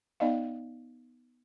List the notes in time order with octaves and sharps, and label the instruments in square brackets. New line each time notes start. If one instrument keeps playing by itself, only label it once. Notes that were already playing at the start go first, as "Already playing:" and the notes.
[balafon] B3 D#4 D5 D#5 F5